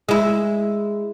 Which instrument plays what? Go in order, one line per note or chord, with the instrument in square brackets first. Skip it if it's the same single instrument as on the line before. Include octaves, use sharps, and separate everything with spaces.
[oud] G#3 E4